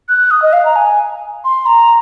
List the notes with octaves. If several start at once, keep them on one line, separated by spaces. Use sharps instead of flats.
F#6
D#6
D#5
F5
A#5
G#5
C6
A#5